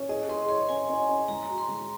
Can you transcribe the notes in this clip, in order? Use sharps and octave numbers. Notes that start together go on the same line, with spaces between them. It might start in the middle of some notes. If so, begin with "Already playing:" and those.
Already playing: C#4
G#4 D#5
G#4 C6
C#5 C6
C#4 G#5
C#4
C#4
G#3 A#5
F#4
C6
G#3